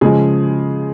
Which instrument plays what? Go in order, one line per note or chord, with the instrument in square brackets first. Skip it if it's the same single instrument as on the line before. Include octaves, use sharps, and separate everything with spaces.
[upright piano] C#3 F3 G#3 G#4